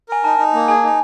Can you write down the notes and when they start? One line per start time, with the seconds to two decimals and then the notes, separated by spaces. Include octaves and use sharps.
0.09 A#4 G#5
0.24 D#4 A5
0.38 D#4
0.54 A#3
0.68 G#4 G#5
0.84 D#4